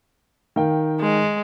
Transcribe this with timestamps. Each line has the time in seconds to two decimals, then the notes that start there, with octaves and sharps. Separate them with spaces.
0.56 D#3 F5 G5
1.00 G#3